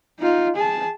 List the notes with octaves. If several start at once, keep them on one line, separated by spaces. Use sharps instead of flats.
D#4 F4
G#4 A5